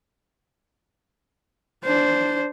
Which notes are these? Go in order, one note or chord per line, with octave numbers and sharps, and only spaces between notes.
D4 C5